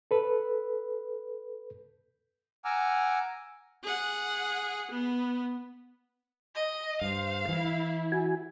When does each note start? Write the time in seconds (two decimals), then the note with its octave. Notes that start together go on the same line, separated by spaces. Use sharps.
0.11 A4 B4
2.65 F#5 G#5 A#5 D6 E6 F6
3.84 G#4 F#5
4.91 B3
6.55 D#5
7.02 G2 C5 F5
7.49 E3 E4
8.12 F#4 G#5